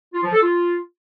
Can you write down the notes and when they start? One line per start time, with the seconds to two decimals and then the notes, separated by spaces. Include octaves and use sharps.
0.14 F4
0.23 F3
0.32 A4
0.42 F4